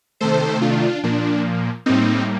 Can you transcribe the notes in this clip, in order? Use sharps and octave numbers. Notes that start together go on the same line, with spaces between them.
C3 D#3 A3 A4 C5
D4 F4
A#2 F3 A#3 D4
A2 G3 A#3 C4 D#4